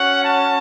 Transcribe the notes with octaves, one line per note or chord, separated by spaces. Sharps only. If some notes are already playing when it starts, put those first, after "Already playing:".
Already playing: C#4 F#4 F#5
A5